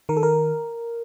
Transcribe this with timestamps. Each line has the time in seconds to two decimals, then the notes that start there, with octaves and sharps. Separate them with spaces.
0.09 D#3 A#4
0.17 A4
0.23 A#4